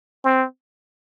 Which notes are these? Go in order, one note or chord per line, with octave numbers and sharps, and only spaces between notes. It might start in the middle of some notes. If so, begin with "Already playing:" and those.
C4